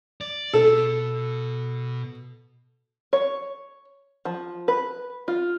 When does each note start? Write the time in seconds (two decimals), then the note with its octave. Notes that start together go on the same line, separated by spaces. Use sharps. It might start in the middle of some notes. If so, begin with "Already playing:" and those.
0.21 D5
0.53 B2 A4
3.13 C#5
4.25 F3
4.68 B4
5.28 F4